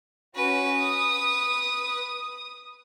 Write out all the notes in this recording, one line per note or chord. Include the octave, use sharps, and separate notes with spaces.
C#4 F#4 B4
D#6